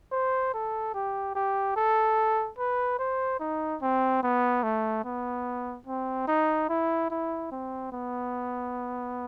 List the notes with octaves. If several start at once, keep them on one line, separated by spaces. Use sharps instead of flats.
C5
A4
G4
G4
A4
B4
C5
D#4
C4
B3
A3
B3
C4
D#4
E4
E4
C4
B3